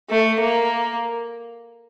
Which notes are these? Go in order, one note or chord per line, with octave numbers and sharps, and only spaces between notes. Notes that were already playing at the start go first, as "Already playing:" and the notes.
A3
A#3